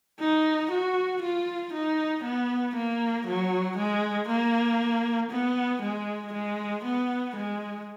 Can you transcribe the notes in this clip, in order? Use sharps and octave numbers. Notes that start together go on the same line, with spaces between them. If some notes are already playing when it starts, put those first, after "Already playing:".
D#4
F#4
F4
D#4
B3
A#3
F#3
G#3
A#3
B3
G#3
G#3
B3
G#3